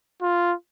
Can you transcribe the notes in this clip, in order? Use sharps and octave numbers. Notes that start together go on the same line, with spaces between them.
F4